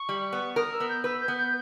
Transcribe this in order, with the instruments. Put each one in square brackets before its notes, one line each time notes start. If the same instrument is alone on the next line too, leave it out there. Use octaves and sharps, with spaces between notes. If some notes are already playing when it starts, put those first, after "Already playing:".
Already playing: [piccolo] C#6
[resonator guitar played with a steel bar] G3
B3
[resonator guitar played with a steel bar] A#4 [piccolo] D#6
[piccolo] E6
[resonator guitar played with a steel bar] B3
[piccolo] G6
[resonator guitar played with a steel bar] B4 [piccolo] E6
[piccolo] G6
[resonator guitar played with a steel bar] B3
[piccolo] G6